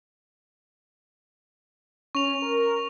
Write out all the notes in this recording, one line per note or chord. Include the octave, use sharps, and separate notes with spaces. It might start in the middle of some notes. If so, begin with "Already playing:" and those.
C#4 C#6 F7
A#4